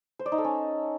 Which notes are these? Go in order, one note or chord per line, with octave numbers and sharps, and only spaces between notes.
C5
D5
D#4
A4
C#4